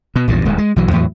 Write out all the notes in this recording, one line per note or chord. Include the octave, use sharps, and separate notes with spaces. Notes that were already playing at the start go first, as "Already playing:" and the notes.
B2
A#1 E2 G2 F3
D1 D#2 G#3
G#3
B1 E3 F#3
E2 A2 E3 F#3